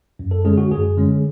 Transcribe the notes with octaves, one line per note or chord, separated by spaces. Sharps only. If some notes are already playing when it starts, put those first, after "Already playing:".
F#2
A4
D3 G#3 C#4 G#4
F#4
F#2 G#4
D3 G#3 C#4